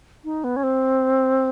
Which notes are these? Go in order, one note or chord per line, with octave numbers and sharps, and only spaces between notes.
D#4
B3
C#4
C4